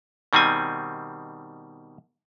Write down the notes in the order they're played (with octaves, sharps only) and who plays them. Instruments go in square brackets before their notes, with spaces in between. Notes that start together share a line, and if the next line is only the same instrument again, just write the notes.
[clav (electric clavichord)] B2 D#3 G3 C4 G#5